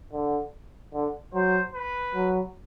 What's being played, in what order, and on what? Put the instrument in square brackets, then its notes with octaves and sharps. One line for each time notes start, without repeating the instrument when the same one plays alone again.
[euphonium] D3
D3
[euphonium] F#3 [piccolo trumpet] C5
[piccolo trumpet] B4
[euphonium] F#3